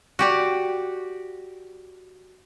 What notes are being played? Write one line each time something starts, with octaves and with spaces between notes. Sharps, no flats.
F#4 G4 D5